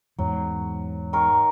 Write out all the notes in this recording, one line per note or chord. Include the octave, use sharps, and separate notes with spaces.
E2 G#2 F#3
D#3 A#4 C#6